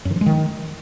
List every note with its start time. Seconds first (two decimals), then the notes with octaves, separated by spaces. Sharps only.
0.05 F#2
0.11 D#3
0.16 F3
0.21 G#3
0.26 D#3